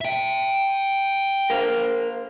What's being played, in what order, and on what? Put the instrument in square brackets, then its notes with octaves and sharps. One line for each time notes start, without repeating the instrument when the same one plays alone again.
[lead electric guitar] E5 G5
[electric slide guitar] A#4 C5 F5